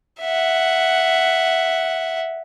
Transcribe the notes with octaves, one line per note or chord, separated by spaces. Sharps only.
E5 F#5